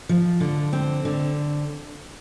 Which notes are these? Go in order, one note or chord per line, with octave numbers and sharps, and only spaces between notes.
F3
D3
C4
D3